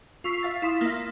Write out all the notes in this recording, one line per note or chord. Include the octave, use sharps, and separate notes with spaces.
F4 C#6 E6 B6 C7 F7
E5 F5 A6
E4 F5 C6 D#6
A#3 E5